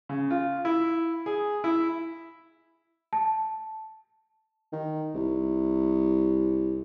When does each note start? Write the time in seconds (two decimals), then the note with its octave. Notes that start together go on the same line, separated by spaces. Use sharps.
0.09 C#3
0.31 F4
0.65 E4
1.26 G#4
1.64 E4
3.13 A5
4.73 D#3
5.14 C2